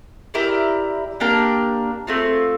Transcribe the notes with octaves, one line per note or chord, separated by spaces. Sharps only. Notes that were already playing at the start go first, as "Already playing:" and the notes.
E4 G4 A#4 D5
A#3 D4 G4 A#4
A3 C4 F4